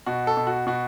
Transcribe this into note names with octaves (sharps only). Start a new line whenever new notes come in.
B2 F#4
A4
B2
F#4
B2 F#4